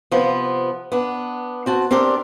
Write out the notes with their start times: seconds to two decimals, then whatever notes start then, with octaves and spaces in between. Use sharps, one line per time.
0.11 C3 F3 B3
0.92 B3 D4
1.66 C4 F#4 A5
1.91 C4 D4 G4 A#4 D5